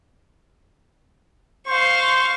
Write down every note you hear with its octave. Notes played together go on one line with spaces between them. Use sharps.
C5 F5 C#6